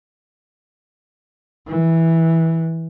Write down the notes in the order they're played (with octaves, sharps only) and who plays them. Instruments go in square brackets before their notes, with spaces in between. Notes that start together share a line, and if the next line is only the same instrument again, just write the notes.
[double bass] E3